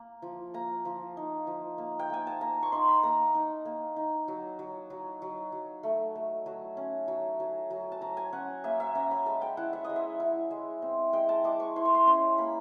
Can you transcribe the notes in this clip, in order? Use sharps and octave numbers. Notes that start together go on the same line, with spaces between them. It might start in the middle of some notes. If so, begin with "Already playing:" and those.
Already playing: A#3
F3
A#3 A#5
F3
D#4
F3
A#3
G5
A#3 G#5
A5
A#3 A#5
C#6
D#4 C6
B5
A#3 A#5
D#4
A#3
D#4
F#3
F#3
F#3
F#3
F#3
A3
A3
F#3
C#4
F#3
F#3
F#3
A5
F#3 A#5
G#5
C#4 F#5
A#3 E5
E5
C#4 A#5
B5
G#3 A5
G5
E4 F#5
E5
G#3 D#5
E5
E4
G#3
C4
G#3 G5
A5
G#3 D6
C#6
E4 C6
C#6
C6
C#4 C6
A#3 B5